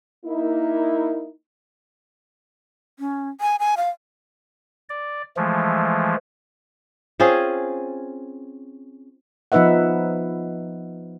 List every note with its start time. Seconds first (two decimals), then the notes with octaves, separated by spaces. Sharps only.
0.25 A#3 D#4 E4
2.99 C#4
3.41 G#5
3.60 G#5
3.77 F5
4.89 D5
5.37 E3 F3 G#3 A3
7.20 C4 C#4 F4 G#4
9.52 F3 B3 D#4 B4 E5 F#5